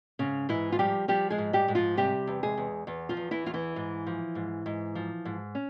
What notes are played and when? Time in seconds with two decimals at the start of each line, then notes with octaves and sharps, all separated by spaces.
0.19 G#2 C#3 C#4
0.49 G#2 E3 E4
0.72 F4
0.79 F3 G3 G4
1.08 F3 G3 G4
1.30 G#3 G#4
1.38 G#2
1.53 G3 G4
1.68 G#2
1.75 F3 F4
1.97 C3 G3 G4
2.27 E2
2.43 G#3 G#4
2.57 E2
2.87 E2
3.09 F3 F4
3.17 E2
3.31 E3 E4
3.46 E2 F4
3.54 E3 E4
3.76 G#2
4.06 F3
4.35 G#2
4.66 G#2
4.95 F3
5.25 G#2
5.55 C#4